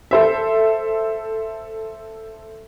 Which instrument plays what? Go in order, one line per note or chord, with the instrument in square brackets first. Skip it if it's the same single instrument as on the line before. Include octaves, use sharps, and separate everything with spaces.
[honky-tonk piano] A4 C5 E5